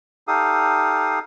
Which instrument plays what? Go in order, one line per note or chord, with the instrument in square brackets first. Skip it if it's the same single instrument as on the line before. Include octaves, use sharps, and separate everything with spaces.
[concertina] D#4 G4 A4 F5 D#6